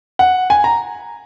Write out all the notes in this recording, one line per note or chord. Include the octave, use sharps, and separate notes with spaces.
F#5
G#5
A#5